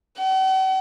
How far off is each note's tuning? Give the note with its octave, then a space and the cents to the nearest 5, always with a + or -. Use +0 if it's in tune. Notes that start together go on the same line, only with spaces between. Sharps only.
F#5 +45